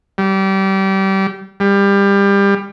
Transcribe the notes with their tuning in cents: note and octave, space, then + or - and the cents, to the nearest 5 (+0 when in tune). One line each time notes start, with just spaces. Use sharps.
G3 -25
G3 +25